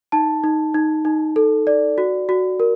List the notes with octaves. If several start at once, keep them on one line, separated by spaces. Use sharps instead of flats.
D#4 A5
D#4
D#4
D#4
A4
D5
F#4
F#4
A#4